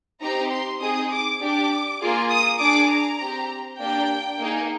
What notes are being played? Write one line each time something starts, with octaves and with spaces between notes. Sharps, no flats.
C4 D#4 G4 A#5
C6
C4 D#4 G#4 D#6
D6
D4 G4 D6
A#3 F4 G#4
D#6
D4 G#4 D6
A#5
C4 G4
A#3 D4 G4 G5
A#3 D#4 G#4